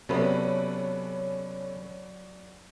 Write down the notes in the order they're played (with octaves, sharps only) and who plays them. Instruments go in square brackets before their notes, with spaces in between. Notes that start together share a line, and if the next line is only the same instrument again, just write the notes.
[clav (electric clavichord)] C3 B3 [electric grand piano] F#3 D5 [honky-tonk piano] C#4 A4 B4